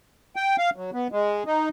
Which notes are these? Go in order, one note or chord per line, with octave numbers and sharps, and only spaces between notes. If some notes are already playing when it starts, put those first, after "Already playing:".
G5
F5
F#3
B3
G#3
D#4